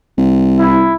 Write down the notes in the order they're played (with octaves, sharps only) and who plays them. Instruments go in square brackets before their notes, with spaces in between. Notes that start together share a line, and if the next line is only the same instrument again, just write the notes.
[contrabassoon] C2
[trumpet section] E4